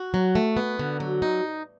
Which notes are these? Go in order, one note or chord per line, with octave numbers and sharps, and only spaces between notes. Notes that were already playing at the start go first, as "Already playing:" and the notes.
Already playing: F#4
F#3
A3
B3
D3
F#3
D#4